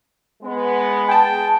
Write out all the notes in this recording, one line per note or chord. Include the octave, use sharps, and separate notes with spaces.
G#3 B3
G#4 G5 A5